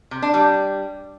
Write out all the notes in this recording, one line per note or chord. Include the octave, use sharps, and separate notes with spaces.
C3
D4
G3